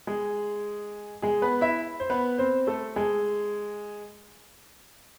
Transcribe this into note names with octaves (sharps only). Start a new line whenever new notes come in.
G#3 G#4
G#3 G#4
B3 B4
E4 E5
C5
B3 B4
C4 C5
A3 A4
G#3 G#4